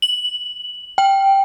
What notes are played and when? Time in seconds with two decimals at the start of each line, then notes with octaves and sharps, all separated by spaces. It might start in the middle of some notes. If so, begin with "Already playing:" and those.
0.02 F#7
0.98 G5